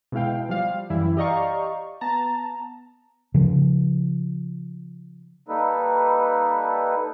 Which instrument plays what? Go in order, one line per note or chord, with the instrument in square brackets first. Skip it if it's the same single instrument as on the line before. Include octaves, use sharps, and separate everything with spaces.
[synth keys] B2 G#3 E4 F5 G5
F3 G3 F5
F#2 E3 G3 E4
G4 D5 D#5 F5 A#5 C#6
B3 A5 A#5
[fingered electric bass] C#3 F3
[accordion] G3 A#3 D#4 A4 B4